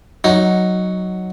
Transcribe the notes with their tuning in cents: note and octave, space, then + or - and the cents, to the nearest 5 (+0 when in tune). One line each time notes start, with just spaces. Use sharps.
F#3 +0 D#4 +0